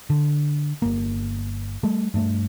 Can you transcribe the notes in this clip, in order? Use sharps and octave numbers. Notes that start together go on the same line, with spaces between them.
D3
G1 A#3
G3 A3
G2 A3